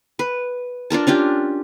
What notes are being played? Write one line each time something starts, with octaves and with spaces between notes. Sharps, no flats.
B4
D4 F4 A#4 A5
C#4 D4 F4 G4